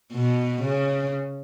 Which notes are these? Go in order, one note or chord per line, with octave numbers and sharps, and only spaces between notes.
B2
C#3